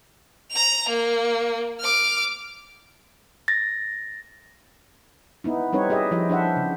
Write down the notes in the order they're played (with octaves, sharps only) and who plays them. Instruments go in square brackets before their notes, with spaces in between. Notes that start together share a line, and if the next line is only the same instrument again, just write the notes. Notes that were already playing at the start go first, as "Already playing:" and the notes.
[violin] A#5 F7
A#3
D6 F6
[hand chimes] A6 A#6
[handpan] B3 D#4 E4
G3 C4 D#4 B4 C#5
F4 G4 G#4 D#5 E5
F3 E4 G4 D#5
D4 C5 E5 F#5
C#3